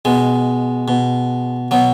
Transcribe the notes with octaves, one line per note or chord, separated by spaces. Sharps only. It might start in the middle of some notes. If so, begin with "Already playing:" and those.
B2 G#3
B2
B2 F#3